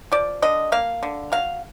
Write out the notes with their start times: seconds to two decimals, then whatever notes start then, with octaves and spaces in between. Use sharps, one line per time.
0.12 F3 D5
0.42 D3 D#5
0.72 A#3 F5
1.03 D3
1.32 F#3 F5